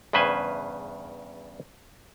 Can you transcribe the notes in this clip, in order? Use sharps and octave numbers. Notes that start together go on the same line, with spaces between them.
E2 G2 C#3 B4 C5 G#5